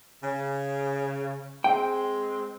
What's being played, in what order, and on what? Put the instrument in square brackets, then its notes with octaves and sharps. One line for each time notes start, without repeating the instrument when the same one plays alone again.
[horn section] C#3
[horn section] G#3 C4 [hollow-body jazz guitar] G5